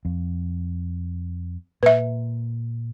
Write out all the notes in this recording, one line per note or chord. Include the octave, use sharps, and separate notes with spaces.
F2
A#2 B4 E5